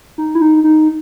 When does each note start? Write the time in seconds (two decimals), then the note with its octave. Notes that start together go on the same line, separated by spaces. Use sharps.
0.18 D#4
0.35 E4
0.42 D#4
0.64 D#4